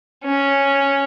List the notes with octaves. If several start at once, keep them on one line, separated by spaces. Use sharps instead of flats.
C#4